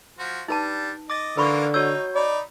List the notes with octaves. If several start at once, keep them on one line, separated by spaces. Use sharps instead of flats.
F3 F#4
G3 D4 D#4 B4 A5
D#5 D6 A6
D3 E3 A#3 F4 B4 B5 C#6
D#4 F#4 C#5 E6 G6
D#4 D5 B5